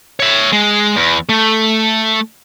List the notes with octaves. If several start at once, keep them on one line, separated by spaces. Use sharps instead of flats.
C#5 E5
G#3
E2
A3